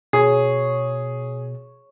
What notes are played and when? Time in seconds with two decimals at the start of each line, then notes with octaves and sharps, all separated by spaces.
0.13 B2 G#4 C#5